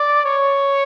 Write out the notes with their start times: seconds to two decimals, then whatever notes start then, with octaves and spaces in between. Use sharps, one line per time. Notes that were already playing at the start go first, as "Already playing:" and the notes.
Already playing: D5
0.23 C#5